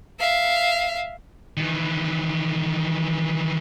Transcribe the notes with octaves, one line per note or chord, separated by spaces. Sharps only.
E5 F5
D#3 E3